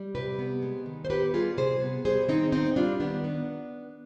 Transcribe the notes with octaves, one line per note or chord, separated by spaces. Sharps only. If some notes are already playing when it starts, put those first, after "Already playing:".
Already playing: G3
C3 G4 B4
B3
G#3
D#3
C5
B3 G4 B4
G3 F4 G#4
C3 G#4 C5
B3
G3 G#4 C5
D#3 C4 D#4
B3 C4 D#4
G3 D4 F4
D#3 B3 D4
B3